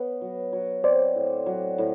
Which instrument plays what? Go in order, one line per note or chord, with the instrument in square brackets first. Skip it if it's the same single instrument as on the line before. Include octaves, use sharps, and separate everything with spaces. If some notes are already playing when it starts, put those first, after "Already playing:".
Already playing: [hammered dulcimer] B3 [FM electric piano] B4 C#5
[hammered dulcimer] F#3
F#3
[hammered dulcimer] C4 [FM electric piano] C5 D5
[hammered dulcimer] A2
F#3
A2